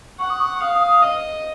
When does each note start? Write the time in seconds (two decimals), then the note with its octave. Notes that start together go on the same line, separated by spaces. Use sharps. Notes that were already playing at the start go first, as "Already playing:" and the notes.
0.19 F#5 C#6
0.30 D#6
0.40 C#6
0.61 F5 D#6
0.81 D#6
1.02 D#5